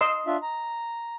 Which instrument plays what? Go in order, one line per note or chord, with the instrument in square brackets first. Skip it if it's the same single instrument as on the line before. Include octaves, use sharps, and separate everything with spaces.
[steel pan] D#5 C6 E6
[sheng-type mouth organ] D4 F4 E5
A#5